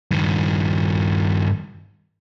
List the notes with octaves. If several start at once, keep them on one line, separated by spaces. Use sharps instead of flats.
G2 D#3